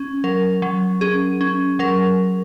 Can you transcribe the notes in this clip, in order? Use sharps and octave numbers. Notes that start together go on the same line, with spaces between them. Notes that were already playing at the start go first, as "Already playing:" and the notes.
Already playing: C#4
F#3 A#4
F#3
C#4 G#4
C#4
F#3 A#4